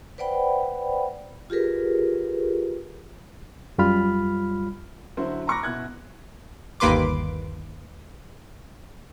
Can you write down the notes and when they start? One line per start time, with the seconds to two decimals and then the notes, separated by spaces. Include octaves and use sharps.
0.18 B4 C5 D5 F#5 G5 B5
1.50 F4 G4 G#4 A#4 B4
3.78 F#2 G3 F4 B5 F6
5.17 D3 F#3 E4 F#4 C5
5.47 A#5 B5 C#6 D6 F#6 A#6
5.63 B2 E4 F#6 G#6
6.80 G1 D#2 A#3 B4 C6 D6